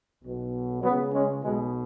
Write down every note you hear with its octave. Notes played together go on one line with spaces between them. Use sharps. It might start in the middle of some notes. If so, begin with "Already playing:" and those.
B1 B2
C#2 C#3 F#3 B3
G#3 C#4
B1 B2 G#3